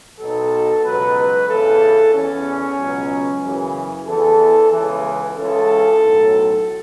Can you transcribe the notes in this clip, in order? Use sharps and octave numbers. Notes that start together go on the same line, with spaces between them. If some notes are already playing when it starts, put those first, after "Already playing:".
B1 B2 F#3 A4
C#2 B2 F#3 B4
E2 C#3 E3 A4
E2 E3 C#4
C#2 B2 F#3
F#2 C#3 E3
E2 E3 A4
C#2 C#3 E3
C#2 C#3 E3 A4
B1 A2 F#3